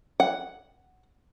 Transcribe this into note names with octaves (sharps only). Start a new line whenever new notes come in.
F#5